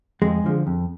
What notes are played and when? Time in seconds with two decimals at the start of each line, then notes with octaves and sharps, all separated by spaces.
0.22 F2 G#3
0.44 D3 F3
0.67 F2